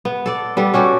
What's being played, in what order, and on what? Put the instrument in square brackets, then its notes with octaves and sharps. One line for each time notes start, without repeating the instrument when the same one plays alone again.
[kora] B3
A4 D5
G3 B3 A4
C#4 F#4 G4 A4